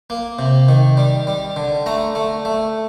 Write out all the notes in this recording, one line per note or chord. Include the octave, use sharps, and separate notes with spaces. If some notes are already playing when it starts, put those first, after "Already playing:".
A#3
C3
D#3
G3
G3
D3
A3 A#5
A3
A3